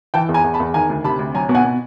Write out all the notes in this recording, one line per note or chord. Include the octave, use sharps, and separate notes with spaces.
E3 G5 A5
E2
G#5 A#5
E2
A5 B5
E2
D#3 G#5 A#5
D2
C3 A5 B5
D2
F#3 G#5 A#5
B2
F#5 G#5
B2